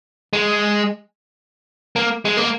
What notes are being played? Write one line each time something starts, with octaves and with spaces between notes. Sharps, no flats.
G#3
A#3
G#3
A#3